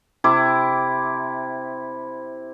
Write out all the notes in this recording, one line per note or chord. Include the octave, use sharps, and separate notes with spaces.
C3 E4 D6